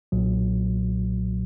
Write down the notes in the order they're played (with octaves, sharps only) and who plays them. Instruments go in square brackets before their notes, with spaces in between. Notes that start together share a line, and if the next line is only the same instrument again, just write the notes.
[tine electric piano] B1 A#2 F#3